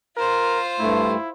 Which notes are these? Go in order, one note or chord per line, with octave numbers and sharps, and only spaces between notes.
F4 A#4 C5
G2 A3 E4